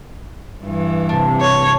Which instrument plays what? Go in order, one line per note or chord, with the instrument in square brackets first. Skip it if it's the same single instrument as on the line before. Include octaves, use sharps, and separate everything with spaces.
[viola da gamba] G2 E3
[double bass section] C3 [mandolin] D4
[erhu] C#5